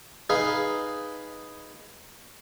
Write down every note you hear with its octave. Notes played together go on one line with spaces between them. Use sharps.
D#4 G#4 B4 F5